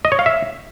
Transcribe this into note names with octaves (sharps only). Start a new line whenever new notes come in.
D#5
C#5
F5
E5